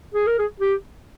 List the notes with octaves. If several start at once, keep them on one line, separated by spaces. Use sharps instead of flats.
G#4
A#4
G#4
G4